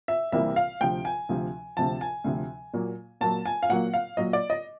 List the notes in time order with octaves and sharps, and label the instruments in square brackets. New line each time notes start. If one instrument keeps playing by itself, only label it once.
[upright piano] E5
C2 C3 E3 G3 A#3 E5
F5
D2 C3 F3 G5
G#5
D2 C3 F3
D2 C3 F3 A5
G#5
D2 C3 F3
A#2 F#3 A#3
A#2 F#3 A#3 A5
G#5
F5
A#2 F#3 A#3 F#5
F5
A#2 F#3 A#3 D#5
D5
D#5